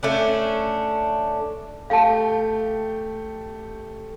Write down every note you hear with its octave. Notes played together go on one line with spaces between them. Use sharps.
A3 C#4 D4
A3 G4 F5 A5